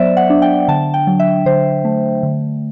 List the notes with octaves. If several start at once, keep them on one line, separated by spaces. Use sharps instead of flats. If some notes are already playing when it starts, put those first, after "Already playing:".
Already playing: F#3 B3 C5 D5 E5
F#5
D4
G5
D3 A5
G5
F#3
E5
D3 C5
A3
D3